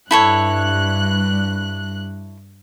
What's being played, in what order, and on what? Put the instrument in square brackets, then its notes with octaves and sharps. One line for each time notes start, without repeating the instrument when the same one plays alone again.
[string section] G2 F#6 [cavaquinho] E4 A4 C#5